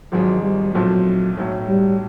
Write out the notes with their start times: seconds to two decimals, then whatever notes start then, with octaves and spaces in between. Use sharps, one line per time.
0.12 G#1 G#2 F3 F#3 G#3
0.43 G3
0.74 B1 A#2 F3 F#3 A3 C4
1.37 B1 A2 F#3
1.69 G3